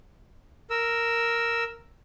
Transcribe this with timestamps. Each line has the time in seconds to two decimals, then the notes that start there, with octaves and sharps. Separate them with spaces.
0.70 A#4 E6